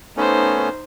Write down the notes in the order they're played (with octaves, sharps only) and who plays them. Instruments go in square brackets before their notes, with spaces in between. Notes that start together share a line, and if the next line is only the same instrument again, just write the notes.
[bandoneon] A3 B3 C#4 [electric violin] D#4 C5